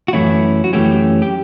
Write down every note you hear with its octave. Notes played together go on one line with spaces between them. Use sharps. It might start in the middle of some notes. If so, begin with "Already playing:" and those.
F#4
F#2 E3 A3 C#4 E4
F#4
F#2 E3 A3 C#4 G4
G4